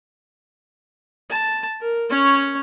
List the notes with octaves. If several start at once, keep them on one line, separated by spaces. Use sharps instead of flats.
A5
A#4
C#4 C#5